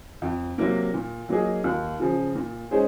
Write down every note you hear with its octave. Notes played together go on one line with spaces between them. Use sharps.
F2
C3 F#3 A#3
A#2
F#3 A#3 D#4 G#4
D#2
C#3 F3
A#2
G#3 C#4 G#4 C5